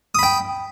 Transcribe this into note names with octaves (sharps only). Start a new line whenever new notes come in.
G5 B5 D#6